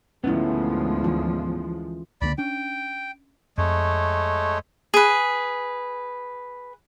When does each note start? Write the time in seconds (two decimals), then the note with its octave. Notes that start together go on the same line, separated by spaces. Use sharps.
0.24 D2 G#2 F3 G#3 B3 C#4 E4
1.04 E3 F4
2.21 C#2 D3 A#3 D5 B5
2.38 C#4 D4 G5
3.58 F2 G#3 A3 C#5
4.94 G#4 B4